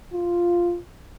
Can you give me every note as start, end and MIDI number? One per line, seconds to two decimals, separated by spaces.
0.12 0.78 65